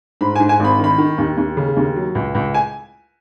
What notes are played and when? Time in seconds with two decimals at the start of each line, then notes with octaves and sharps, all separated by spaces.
0.21 G#2 B5
0.36 G#5
0.40 G#2
0.49 G#5
0.60 G#1 B5
0.79 D#3 B5
0.98 D#3
1.18 D#2
1.37 D#2
1.57 C#3
1.77 D#2
1.96 F#3
2.15 C#2
2.35 C#2
2.54 G#5